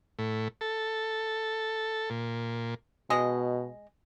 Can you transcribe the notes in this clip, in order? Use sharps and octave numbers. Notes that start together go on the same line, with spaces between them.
A2
A4
A#2
B2 G#3 D#5